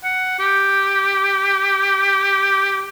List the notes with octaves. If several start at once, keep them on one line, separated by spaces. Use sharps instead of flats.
F#5
G4